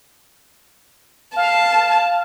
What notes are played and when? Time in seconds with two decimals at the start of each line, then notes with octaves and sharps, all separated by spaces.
1.36 F5 A5